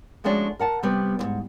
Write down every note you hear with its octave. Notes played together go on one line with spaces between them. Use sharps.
F3 G#3 A3 C#4 D4 F#4
A#4 F#5 A5
C3 G3 B3
D2 G#2